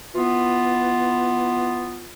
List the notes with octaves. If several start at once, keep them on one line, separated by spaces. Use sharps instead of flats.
E3 B3 F4